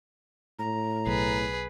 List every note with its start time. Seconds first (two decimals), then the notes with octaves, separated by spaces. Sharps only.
0.59 A2 A#5
1.07 B1 G#4 B4